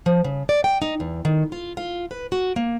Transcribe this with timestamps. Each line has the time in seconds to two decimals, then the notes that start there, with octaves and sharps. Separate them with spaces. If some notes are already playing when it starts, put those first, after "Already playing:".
0.06 F3
0.24 C#3
0.49 D5
0.64 G5
0.82 D#4
1.00 E2
1.25 D#3
1.52 F4
1.77 F4
2.11 B4
2.32 F#4
2.56 A#3